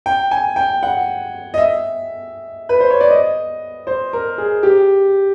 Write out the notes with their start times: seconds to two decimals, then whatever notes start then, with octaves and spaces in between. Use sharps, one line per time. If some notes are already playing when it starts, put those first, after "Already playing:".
0.06 G5
0.31 G#5
0.56 G5
0.83 F#5
1.54 D#5
1.58 E5
2.69 B4
2.80 C5
2.90 C#5
3.01 D5
3.10 D#5
3.87 C5
4.13 A#4
4.38 G#4
4.63 G4